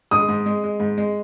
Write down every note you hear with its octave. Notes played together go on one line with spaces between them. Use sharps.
G#3 D#6
G#2
G#3
G#3
G#2
G#3